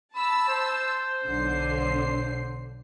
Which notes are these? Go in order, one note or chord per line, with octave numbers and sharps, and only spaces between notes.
A5 B5 E6
C5
B1 D3 C7